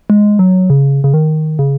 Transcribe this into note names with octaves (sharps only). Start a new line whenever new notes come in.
G#3
F#3
C#3
C#3
D#3
C#3